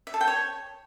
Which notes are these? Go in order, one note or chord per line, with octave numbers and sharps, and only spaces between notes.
E5
A4
G5
C#5